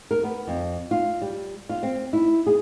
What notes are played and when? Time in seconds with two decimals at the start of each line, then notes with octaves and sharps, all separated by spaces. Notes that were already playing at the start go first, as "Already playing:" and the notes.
0.11 A#4
0.24 B3
0.48 F2
0.91 F4
1.22 G3
1.69 F4
1.83 C4
2.13 E4
2.47 G#4